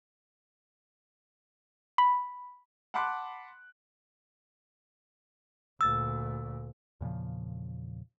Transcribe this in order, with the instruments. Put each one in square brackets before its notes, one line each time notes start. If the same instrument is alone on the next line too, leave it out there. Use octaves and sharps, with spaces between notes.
[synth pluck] B5
[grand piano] F#5 A5 B5 C6 D6 F#6
[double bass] D2 A#2 [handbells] E6 A6
[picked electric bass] E2 A#2 C#3 F3